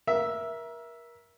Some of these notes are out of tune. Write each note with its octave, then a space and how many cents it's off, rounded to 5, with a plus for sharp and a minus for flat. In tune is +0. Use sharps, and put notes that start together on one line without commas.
A#4 +30 E5 +0